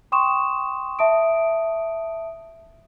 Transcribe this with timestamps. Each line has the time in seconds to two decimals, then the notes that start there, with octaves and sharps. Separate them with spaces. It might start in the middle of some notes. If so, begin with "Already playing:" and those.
0.12 G5 C6 C#6 D#6 E7
0.99 E5 A5 D#6 D7